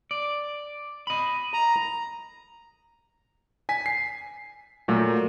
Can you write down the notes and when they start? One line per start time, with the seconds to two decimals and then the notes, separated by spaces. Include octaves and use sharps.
0.11 D5
1.07 D#5 B5
1.53 A#5
3.69 G#5 B6
3.86 C7
4.88 A#2 F#3 A3